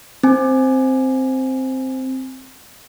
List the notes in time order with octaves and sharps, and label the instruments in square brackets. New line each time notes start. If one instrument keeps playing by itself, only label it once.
[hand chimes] C4 G#5